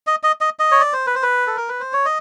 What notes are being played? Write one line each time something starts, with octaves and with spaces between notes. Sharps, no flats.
D#5
D#5
D#5
D#5
C#5
D5
C5
B4
C5
B4
A4
A#4
B4
C5
C#5
D#5